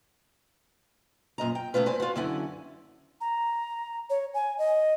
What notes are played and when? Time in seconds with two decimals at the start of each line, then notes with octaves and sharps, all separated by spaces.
1.38 F#2 A#2 D#5 A#5
1.55 G5
1.74 C#3 A3 C#4 F4 B4
1.86 G2 C4 B4 C5 G#5
2.00 F4 F#4
2.15 F#2 D3 C#4 E4 F#5 G#5
3.21 A#5
4.10 C#5
4.34 G#5
4.58 D#5